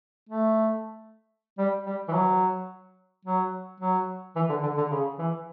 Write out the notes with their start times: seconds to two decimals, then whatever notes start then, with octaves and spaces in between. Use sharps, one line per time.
0.29 A3
1.58 G3
1.86 G3
2.08 E3
2.13 F#3
3.25 F#3
3.80 F#3
4.36 E3
4.49 D3
4.63 D3
4.77 D3
4.91 C#3
5.18 E3